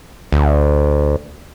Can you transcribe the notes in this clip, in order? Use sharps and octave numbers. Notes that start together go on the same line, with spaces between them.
D2